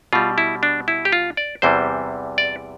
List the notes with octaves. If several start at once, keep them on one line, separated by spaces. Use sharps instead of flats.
B2 G3 F4
E4
D4
E4
G4
F4
D5
E2 C3 E3 G3 C5
D5